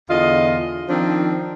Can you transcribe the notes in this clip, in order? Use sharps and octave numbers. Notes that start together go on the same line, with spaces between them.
E2 D3 F4 D#5
D#3 F3 C4 D4 D#4